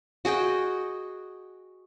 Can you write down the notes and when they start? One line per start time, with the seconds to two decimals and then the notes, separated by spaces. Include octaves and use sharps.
0.25 F#4 G#4 D#5 G5